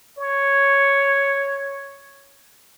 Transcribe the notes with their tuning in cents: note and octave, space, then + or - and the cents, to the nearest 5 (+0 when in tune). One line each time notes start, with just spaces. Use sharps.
C#5 +0